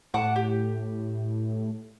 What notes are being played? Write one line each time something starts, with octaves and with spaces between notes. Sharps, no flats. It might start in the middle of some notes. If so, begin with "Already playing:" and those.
A2 F#5 A5 D6
G4